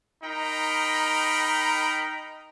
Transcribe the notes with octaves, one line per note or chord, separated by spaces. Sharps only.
D#4 A#4 G5 A#5 B5